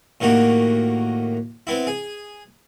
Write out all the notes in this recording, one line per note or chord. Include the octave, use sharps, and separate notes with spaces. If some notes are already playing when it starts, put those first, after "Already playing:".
A2 D#3 A#3 F#4 G4
B3 C4 E4
G#4